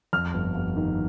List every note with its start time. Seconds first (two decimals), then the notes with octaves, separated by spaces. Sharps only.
0.13 F2 F6
0.34 G1
0.55 G1
0.77 D#3